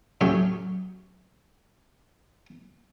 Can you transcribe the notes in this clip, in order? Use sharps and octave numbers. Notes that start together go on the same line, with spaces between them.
A2 F#3 C#4 G4